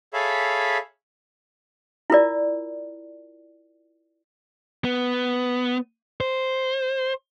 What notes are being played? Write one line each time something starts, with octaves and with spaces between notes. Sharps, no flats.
G#4 A4 C#5 E5 F5 B5
E4 F4 A#4 D5
B3
C5